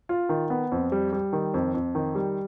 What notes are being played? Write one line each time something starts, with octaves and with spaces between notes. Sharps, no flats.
F4
D#3
B3
F2
G3
G3
D#3
F2
F2
D#3
G3